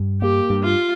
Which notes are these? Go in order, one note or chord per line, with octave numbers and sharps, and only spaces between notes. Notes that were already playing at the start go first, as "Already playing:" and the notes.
Already playing: G2
A#3 G4
G2
F4